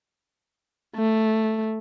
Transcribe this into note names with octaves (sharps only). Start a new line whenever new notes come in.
A3